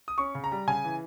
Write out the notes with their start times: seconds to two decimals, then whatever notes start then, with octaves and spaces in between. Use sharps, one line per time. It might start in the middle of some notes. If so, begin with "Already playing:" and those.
0.08 D#6
0.18 C#4 C#6
0.35 C#3
0.44 A#5
0.52 G3
0.67 C#3 G#5
0.85 E3